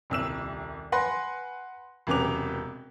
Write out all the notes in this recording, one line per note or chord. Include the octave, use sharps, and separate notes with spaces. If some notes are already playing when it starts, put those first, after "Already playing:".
D#1 C2 E6 E7
B4 F#5 G#5 B5 C6 A#6
E1 F#2 C3 B4 D6 F7